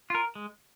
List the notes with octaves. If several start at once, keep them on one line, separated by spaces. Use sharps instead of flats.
F4 A#4
G#3